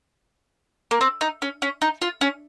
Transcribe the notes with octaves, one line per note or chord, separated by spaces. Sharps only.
A#3
C4
D#4
C#4
C#4
D#4
F4
C#4